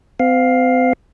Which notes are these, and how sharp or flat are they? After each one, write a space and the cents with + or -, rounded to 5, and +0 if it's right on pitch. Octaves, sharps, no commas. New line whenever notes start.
C4 -35 F5 +10